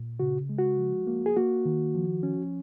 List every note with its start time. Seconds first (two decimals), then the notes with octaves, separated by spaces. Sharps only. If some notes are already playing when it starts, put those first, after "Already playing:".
Already playing: A#2
0.20 C#3 F#4
0.49 G#3
0.59 F#4
0.78 F3
1.07 A#3
1.26 G#4
1.37 A#3 F#4
1.65 D#3
1.95 F3
2.23 C#4